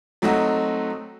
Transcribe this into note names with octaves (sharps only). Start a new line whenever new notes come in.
F#3 A3 C4 D#4 F#4